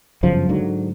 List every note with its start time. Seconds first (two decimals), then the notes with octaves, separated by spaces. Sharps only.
0.23 G1 F#2 C#3 F3
0.49 G#2 D3 F#3